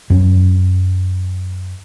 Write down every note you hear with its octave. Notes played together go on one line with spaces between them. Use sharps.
F#2 C#4